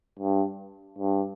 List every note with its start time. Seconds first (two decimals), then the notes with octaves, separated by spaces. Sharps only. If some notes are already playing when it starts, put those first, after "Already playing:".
0.19 G2
0.98 G2